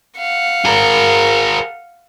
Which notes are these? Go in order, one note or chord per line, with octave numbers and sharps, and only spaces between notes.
F5 F#5
G#4 A#4